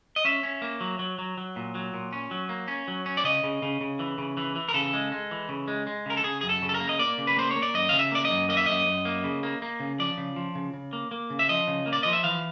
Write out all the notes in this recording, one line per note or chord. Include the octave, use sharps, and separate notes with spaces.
D#5
C#4 E5
C#4
A#3
F#3
F#3
F#3
F#3
A#2
F#3
A#2
C#4
F#3
A#3
C#4
F#3
C#4
D5
C#3 D#5
C#3
C#3
C#3
E3
C#3
E3
E3
A#4
C#3 A4
G#3
G#3
E3
C#3
G#3
G#3
C#3 A#4
A4
C#3 G#4
F#2 G#4
A4
C#3
A4
A#4
A#3
D#5
A#3 D5
C#3
B4
A#3 C5
A#3 C#5
D5
F#2 D#5
C#3 F5
E5
A#3 D5
D#5
F#2
A#3 D#5
E5
F#2 D#5
F#2
A#3
C#3
A#3
A#3
C#3
F3 D5
C#3
F3
C#3
C#3
A#3
A#3
C#3
E5
F3 D#5
C#3
A#3
D5
F3 D#5
E5
E3 F5